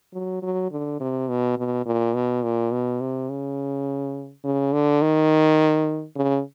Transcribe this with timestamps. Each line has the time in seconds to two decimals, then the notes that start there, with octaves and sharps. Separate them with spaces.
0.13 F#3
0.43 F#3
0.72 D3
1.00 C3
1.29 B2
1.58 B2
1.86 A#2
2.14 B2
2.43 A#2
2.72 B2
3.01 C3
3.30 C#3
4.44 C#3
4.73 D3
5.02 D#3
6.16 C#3